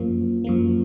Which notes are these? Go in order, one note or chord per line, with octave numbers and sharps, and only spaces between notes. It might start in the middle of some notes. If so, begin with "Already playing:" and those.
Already playing: F#2 F3 A#3
F#2 F3 A#3